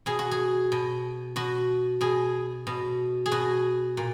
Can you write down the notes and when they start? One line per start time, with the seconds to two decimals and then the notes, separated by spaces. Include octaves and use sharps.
0.06 B2 G#4
0.19 F#4
0.31 G#4
0.72 B2
1.36 B2 F#4
2.01 B2 G#4
2.67 B2
3.26 G#4
3.31 B2 F#4
3.97 A#2